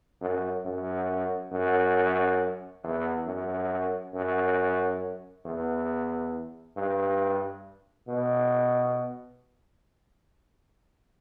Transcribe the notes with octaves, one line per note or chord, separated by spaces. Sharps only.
F#2
F#2
F#2
E2
F#2
F#2
E2
G2
B2